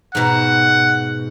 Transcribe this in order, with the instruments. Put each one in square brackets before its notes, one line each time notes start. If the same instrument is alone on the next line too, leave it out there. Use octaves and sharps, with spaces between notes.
[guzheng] G#2 B2 [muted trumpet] F#5